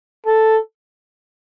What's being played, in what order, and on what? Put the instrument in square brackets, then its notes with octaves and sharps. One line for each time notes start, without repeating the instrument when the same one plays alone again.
[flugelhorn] A4